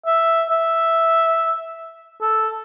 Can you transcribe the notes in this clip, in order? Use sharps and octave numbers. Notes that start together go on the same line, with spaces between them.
E5
E5
A4